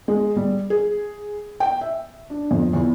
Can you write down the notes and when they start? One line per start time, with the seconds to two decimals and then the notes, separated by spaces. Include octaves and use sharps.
0.08 G#3
0.36 G3
0.70 G#4
1.60 G5
1.81 E5
2.30 D4
2.51 F2
2.73 E2